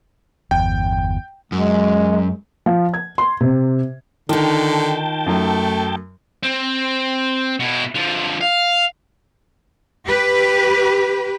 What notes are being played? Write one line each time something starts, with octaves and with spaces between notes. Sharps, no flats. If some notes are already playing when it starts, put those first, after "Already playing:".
G1 E2 G5
F#2 G#3
F3
G#6
C6
C3
D3 D#3 D#4 F4 G5 A5
F#2 F#3 A3
C4
B2 E4
D3 F3
F5
G4 B4